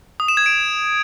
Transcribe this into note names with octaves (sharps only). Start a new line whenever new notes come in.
D#6
E7
G#6
D7